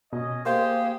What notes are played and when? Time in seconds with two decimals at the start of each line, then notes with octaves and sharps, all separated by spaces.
0.13 B2 C#4 D#5
0.46 A#3 G4 G#4 C5 F5